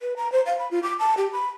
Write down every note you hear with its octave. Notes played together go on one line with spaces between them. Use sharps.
B4
A#5
C5
F5
B5
F4
D6
A5
G4
B5